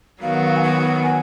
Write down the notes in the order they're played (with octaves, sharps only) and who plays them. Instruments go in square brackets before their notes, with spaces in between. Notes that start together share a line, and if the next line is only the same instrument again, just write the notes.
[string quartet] D#3 F#3 B3 F#4 [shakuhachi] F5
[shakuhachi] F#5
F5
G#5
F#5
G#5